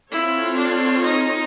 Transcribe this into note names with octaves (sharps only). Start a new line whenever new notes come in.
C4 E4 F4 A4 C#5
D4
D#4